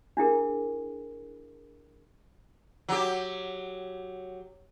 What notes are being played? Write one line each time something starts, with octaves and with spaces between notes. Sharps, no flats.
D4 E4 G#4 A#4
F#3 G4